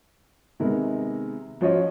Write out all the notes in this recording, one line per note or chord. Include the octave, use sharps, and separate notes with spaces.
C3 D#3 G#3 B3 A#4
F3 F#3 C#4 F4 C#5 D#5